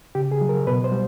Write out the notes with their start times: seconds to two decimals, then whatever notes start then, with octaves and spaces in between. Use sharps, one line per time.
0.15 C#3 G4
0.31 G#4
0.41 F#3
0.49 A#4
0.67 B2 B4
0.84 C5
0.92 G3